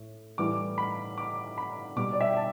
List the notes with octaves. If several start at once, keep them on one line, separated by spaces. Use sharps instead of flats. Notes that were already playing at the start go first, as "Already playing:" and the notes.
Already playing: A2
A2 E3 G3 D6
B5
D6
B5
B2 G3 D6
D5
E5
G5
A5